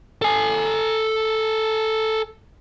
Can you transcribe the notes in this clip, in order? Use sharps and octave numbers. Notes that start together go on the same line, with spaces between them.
A4 G#5